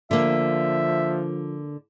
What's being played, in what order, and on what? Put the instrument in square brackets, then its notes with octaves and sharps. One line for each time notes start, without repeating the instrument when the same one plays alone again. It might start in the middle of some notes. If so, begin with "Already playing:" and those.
[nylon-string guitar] D3 A#3 [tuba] F3 [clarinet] E5